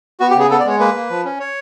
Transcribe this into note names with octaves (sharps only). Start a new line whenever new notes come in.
B3 F#4
G4
C#3 G#4
B3 A4
D5
G#3 C#5
A#3 B4
A#3
F3
C#4
C#5